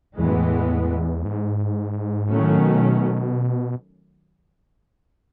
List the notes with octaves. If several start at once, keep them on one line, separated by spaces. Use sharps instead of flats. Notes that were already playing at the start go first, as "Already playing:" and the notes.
E2 A2 E3 G#3 B3
F#2
E2
G#2
A2 D#3 F#3 A3 C#4
B2